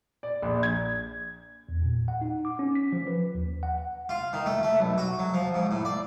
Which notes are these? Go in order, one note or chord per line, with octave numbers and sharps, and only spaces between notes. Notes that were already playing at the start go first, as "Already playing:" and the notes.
D5
A#1
G#6
E2
A#2
F#5
D#4
D6
C#4
B6
F3
B4
D#2
F#5
F4
D#3
A3
A3
B1
F#4
F#3
F3
G#2
A2
D5